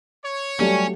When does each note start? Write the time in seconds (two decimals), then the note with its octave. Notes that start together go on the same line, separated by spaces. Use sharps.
0.24 C#5
0.60 F#3 G3 A3 C#4 G4